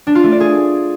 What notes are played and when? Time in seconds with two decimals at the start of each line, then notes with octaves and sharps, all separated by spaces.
0.07 D4
0.15 F4
0.24 A3
0.32 D5
0.40 G#4